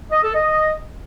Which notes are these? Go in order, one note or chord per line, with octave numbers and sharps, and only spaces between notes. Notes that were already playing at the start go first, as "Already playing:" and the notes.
D#5
A4
D#5